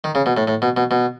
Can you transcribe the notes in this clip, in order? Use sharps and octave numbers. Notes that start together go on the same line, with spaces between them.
D#3
C#3
B2
A2
A2
B2
B2
B2